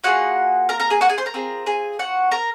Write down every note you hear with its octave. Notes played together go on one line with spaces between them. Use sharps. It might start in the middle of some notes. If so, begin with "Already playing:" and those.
A#3 F4 F#4 G#4 F#5
A#4 A#5
A#4 A#5
G#4 G#5
F#4 F#5
G#4 G#5
C5 C6
A#4 A#5
C4 F4 G#4
G#4 G#5
F#4 F#5
A#4 A#5